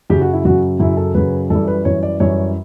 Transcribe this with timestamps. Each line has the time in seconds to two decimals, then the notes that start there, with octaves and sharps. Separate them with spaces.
0.10 F#2 C#3 F#3 G4
0.21 F#4
0.33 E4
0.45 F#2 C#3 F#3 F#4
0.80 F#2 C#3 F#3 E4
0.97 A4
1.15 F#2 C#3 F#3 B4
1.50 F#2 E3 G3 A4
1.68 B4
1.85 F#2 E3 G3 C#5
2.03 D5
2.20 F#2 E3 G3 C#5